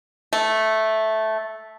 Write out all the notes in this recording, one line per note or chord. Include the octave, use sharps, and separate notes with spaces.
A3